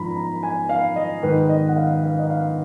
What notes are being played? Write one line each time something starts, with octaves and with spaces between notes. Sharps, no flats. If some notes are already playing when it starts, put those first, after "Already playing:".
Already playing: G#2 F3 A#5 B5
A#5
G#5
F5
D#5
G#2 D#3 B4
D#5
F#5
F5
F5
D#5
F5